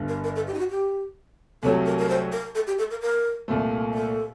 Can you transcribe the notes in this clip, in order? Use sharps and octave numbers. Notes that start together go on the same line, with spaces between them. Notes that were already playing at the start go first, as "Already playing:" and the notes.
Already playing: G1 G2 D3
A#4
A#4
A4
G4
D#4
F#4
G4
C2 C3 F#3 A3 A4
A#4
A#4
C5
A#4
A4
G4
A4
A#4
A#4
C2 A#2 A3
A4